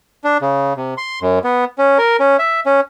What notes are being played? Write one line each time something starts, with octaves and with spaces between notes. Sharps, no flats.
D4
C#3
C3
C6
F#2
B3
C#4
A#4
C#4
E5
C#4